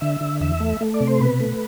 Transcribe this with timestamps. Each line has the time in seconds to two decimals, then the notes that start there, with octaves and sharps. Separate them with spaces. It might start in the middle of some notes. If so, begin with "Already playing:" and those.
0.01 D3 E5
0.21 D3
0.41 E2 E5
0.60 A3
0.81 A3
0.94 D5
1.00 C3
1.07 C5
1.20 B2 B4
1.40 A3